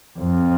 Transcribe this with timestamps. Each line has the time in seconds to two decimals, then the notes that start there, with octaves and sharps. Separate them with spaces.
0.19 F2